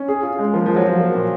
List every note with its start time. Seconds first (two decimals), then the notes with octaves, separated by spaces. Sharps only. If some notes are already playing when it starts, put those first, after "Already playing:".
Already playing: C#4
0.08 G#4
0.23 F4
0.39 G#3
0.54 F3 A#3
0.66 F3 F4
0.76 F#3
0.85 F4
1.00 A#3
1.15 A#2